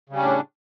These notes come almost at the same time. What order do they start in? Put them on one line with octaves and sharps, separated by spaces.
C#3 G3 C#4 A2 D4